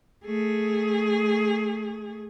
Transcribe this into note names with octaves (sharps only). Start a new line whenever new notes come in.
A3 G#4